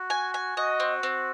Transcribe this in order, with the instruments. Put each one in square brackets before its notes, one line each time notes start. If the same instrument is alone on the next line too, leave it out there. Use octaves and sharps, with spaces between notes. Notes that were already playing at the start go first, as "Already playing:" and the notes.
Already playing: [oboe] F#4
[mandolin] G#5
G#5
[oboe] F#4 [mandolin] D#5
[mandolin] C4
C4